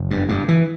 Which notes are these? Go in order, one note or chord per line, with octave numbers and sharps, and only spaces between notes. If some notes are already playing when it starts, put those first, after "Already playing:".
Already playing: F#1
G2
G2
E3